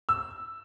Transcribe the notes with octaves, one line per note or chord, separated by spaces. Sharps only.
E6